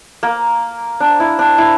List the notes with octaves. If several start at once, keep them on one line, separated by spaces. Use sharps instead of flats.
A#3
D4
E4
D4
E4